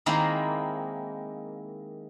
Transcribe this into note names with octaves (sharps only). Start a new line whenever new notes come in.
D#3 G#3 A#3 C4 E4